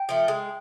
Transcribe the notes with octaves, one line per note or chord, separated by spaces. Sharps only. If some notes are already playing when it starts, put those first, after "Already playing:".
Already playing: G5
F3 A3
G#3